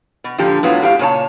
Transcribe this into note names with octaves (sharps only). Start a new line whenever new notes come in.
B2
A#2 D3 F3 G4
A2 F#3 B3 F4
A2 G4 F5
A#2 C#3 C#5 A5